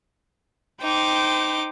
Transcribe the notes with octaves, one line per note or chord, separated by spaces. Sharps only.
D#4 C5 G5 D6